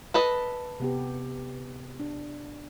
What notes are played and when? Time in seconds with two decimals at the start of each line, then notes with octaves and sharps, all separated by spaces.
0.14 A4 B4 D#5
0.80 C3 B3 G4
2.00 D4